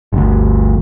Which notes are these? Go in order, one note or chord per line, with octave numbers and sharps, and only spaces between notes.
G1 D2